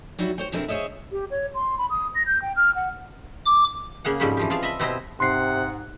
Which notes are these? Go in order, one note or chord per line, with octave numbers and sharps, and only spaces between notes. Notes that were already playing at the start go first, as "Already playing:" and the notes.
F#3 G3 D#4 E4 F#4
C5 C#5 G5
B2 D3 G#3 C4 E4 A#4
G#4 C5 C#5 D#5 E5
G4
C#5
C6
B5
D#6
A#6
G6
G5
F6
F#5
D6
C#3 A#3 G#4 F#5
F2 G#2 G3 C#4 G4 B5
E3 F3 G4
F4 G#4 D5 F5 A5
D#5 E5 A5 B5
B2 C4 E4 G4 C5 D#5
G#2 C3 F#5 C6 C7